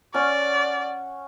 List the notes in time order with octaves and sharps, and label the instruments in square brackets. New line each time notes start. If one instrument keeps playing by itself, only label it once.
[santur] C#4 F#5 C#6 [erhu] D5